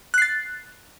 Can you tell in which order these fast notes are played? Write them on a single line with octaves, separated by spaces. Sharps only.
F#6 C7 A6